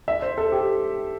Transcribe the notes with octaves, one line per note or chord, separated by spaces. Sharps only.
E5
C5
A4
G4